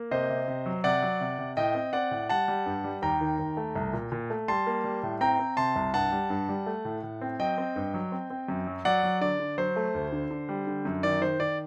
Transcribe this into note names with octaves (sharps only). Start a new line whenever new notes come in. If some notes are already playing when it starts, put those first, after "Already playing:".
Already playing: A#3
C3 C5 D#5
C3
C3
F#3
C3 D5 F#5
F#3
C3
C3
A2 D#5 G5
C4
C4 D5 F#5
A2
G3 F#5 A5
G3
G2
G3
D#2 G5 A#5
D#3
D#2
A3
C2
A#2
A#2
A3
G3 A5 C6
A#3
G3
A2
C4 G5 A#5
C4
C3 A5 C6
C2
G2 F#5 A5
G3
G2
G3
A3
A2
A2
C4
F#3 D#5 G5
C4
G2
F#3
C4
C4
F#2
F#3
F#3 D5 F#5
F#3
D3 D5
D3
F#3 C5
A3
D2
D3
D3
G3
D3
F#2
D#3 D5
D#3 C5
D#3 D5